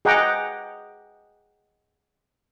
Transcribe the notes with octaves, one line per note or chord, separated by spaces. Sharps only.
G#4 D#5 F#5 G5 A#5 D6